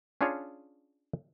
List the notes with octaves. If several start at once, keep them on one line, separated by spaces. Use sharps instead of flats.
C#4 D4 F4 G#4 C#5